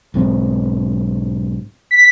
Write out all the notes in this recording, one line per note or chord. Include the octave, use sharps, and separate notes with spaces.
B1 G#2 C4
B6